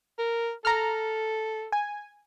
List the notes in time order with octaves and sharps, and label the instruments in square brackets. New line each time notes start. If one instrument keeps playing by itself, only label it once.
[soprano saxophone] A#4
[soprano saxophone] A4 [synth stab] A#5 F6
[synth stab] G#5